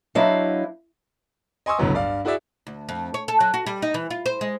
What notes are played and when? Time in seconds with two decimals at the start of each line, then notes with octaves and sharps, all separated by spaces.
0.15 F#3 D4 E4 C5 D#5 F5
1.66 D#5 G#5 C6 C#6 D#6 E6
1.78 G1 C#2 A2 F#3 B3
1.94 G2 D5 F5
2.25 E4 F#4 G#4 D5 E5
2.67 D2
2.89 F2
3.14 C#5
3.28 A4
3.40 F#3
3.54 F#4
3.66 G3
3.82 D#4
3.94 E3
4.10 F4
4.26 C5
4.41 G#3